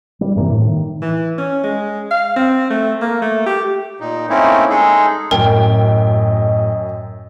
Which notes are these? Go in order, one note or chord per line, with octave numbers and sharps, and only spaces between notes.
G3
G2 C3 E3 A#3
A2
D#3
E3
C#4
G#3
F5
C4
A3
A#3
A3
G4
A#2 D#4
A3 A#3 C4 C#4 D#4 E4
G#3 D#4 G#4 A4
F#2 A2 A#4 D#5 G5